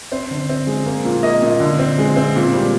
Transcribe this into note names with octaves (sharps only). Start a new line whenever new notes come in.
C4 C5
D3
C4
G#3
A#3
A#2
A#3 D#5
A#2
D3
C4
G#3
C4
A#2
G3